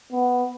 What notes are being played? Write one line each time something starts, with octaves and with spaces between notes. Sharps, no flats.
B3